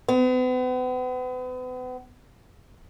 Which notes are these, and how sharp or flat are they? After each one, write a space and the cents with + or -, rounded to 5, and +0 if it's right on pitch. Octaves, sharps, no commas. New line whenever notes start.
B3 +40